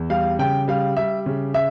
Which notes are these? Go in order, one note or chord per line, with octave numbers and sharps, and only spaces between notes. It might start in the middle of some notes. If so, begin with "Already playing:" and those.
Already playing: E2
G3 F5
C#3 G5
G3 F5
G3 E5
C#3
E5